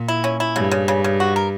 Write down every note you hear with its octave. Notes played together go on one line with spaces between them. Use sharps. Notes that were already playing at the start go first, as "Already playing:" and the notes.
Already playing: A#2
E4
C#4
E4
G2 C#3
C#3
C#3
C#3
F#4
A#4